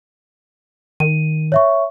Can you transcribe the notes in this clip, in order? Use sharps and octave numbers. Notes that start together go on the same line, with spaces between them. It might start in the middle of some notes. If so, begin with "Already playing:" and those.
D#3 D#7
C#5 E5 C#6